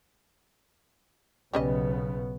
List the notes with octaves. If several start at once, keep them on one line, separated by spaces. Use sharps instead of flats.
B1 C#3 G3 B3 C#4 D#5